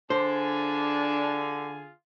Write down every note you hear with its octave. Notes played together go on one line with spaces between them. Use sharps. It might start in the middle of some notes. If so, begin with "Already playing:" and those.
D3 D4 F4 G#4 C5 G#5